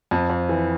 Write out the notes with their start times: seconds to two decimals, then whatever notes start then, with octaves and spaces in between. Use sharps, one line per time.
0.11 F2
0.30 F2
0.49 E3